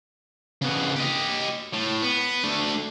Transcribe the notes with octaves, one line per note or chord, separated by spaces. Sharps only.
C#3 B3
G4 D#5
A2
B3
A3 D4